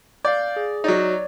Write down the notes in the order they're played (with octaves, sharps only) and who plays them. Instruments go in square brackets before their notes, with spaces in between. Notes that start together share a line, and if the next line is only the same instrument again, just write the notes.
[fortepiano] D5 [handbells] F5 G6
[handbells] G#4
[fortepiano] F#3 D#4 [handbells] C#5 D5